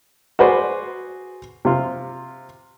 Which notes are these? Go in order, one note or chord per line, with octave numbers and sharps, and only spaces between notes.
F#4 G#4 B4 C5 D5
C3 F4